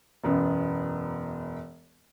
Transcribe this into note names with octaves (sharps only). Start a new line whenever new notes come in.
E1 F#2 B3